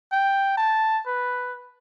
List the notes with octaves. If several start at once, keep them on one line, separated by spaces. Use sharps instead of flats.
G5
A5
B4